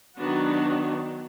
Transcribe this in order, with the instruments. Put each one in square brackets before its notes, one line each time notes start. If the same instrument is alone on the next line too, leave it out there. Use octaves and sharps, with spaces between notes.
[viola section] D#3 F#3 B3 D4 F#4